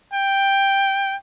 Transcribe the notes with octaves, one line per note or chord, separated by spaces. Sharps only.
G5